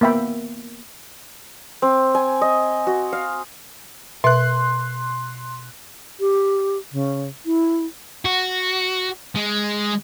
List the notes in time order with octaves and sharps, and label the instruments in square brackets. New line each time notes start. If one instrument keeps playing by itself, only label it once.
[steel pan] A#3 B3 E5 G5 B5
[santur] C4
G#5
D#5
F#4
F5
[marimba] B2 B4 E5 [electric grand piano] C6 F#6
[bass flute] G4
C#3
E4
[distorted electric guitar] F#4
G#3